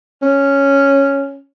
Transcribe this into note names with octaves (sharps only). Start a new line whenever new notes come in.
C#4